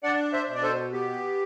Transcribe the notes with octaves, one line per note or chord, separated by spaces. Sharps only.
D4 D5 F#5
C5 E5
B2
D5
A4 C5
B3 G4